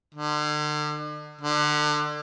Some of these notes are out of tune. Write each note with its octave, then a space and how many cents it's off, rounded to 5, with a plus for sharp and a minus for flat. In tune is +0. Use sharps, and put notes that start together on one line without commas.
D3 +40
D3 +30